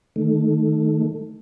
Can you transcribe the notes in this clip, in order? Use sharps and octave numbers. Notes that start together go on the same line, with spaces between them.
D#3 A3